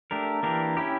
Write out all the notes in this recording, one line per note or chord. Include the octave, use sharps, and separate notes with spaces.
A3 D4 G4 A#4
E3 A#3 D4 G4 A#4
C#4 E4 G4